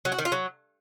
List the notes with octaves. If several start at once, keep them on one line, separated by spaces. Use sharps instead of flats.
F#3
F#4
D#3
F4
F#3